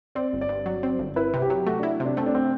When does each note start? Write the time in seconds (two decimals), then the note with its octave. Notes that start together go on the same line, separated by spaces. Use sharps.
0.15 C4 D5
0.33 G1
0.41 D5
0.49 G2
0.66 F#3
0.83 C4
0.99 G1
1.16 E4 B4
1.34 C3
1.42 G4
1.50 F#3
1.67 A3 F#4
1.79 D4 E4
2.00 C3
2.05 D4
2.17 A3 C4
2.26 D4
2.35 C4